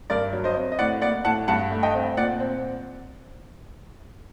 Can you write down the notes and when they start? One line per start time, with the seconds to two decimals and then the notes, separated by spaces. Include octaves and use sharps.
0.10 G2 A#4 D5
0.33 F#3
0.44 C5 D#5
0.56 C4
0.72 D#5
0.79 A2 D5 F#5
1.02 A#3 D5 F#5
1.25 A2 F#5 A5
1.48 G2 F#5 A5
1.71 A3
1.83 D#5 G5
1.94 C4
2.17 A#2 D5 F#5
2.40 C4